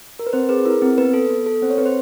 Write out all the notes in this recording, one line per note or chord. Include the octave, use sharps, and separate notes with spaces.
A#4
B4
C4 C5
G#4 B4
E4 A#4
C4
B3 B4
A4
B3
A4
C4 C5
C#5
C4 B4
C5